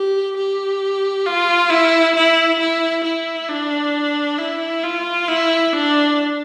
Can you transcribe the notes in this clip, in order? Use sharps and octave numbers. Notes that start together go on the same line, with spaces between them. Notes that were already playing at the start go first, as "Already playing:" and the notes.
Already playing: G4
G4
F4
E4
E4
E4
E4
D4
E4
F4
E4
D4